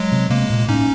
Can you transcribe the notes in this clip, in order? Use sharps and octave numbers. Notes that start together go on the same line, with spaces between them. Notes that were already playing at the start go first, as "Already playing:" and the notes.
Already playing: F#3 G#3
C3
C3 G#3 A#3
A#2
A2 C#4 D#4